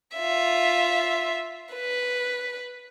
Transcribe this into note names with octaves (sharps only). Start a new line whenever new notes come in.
F4 E5
B4